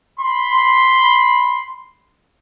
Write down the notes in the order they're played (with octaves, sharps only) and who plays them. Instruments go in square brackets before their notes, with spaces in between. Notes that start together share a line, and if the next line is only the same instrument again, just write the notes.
[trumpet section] B5 C6